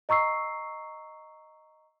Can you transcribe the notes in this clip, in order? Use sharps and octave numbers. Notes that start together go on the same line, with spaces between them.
D#5 A#5 C#6 E6 C7